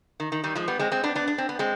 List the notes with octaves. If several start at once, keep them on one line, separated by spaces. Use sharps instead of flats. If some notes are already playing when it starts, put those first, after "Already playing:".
D#3
D#3
D#3 G3
F3 G#3
G3 B3
G#3 C4
G#3 C4
B3 D4
B3 D4
D4
C4
B3
G#3 C4